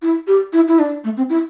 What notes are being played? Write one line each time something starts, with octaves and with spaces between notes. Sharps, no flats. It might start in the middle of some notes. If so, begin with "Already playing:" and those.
E4
G4
E4
E4
D4
A3
C4
E4